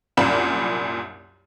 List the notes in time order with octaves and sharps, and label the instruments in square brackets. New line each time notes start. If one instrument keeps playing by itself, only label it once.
[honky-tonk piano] C2 F#2 A#2 D4 B5 E7